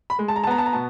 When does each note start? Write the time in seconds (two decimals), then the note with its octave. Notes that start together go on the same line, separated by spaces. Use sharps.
0.10 B5
0.19 G#3
0.28 A5
0.36 A#5
0.44 A5
0.47 B3 A#5
0.58 A5
0.66 A#5
0.73 B2 A5